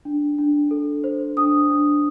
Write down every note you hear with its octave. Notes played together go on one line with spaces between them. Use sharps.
D4
D4
A4
C5
D4 D#6
D4